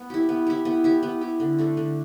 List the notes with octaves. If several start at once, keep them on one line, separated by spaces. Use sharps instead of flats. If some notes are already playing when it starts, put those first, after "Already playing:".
Already playing: B3
E4 G4
B3
E4 G4
B3
E4 G4
B3
E4 G4
D3
A3 D4 A4
D3